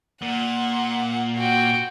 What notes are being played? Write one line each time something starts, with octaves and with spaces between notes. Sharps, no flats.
A#2 F#5
F#4 G5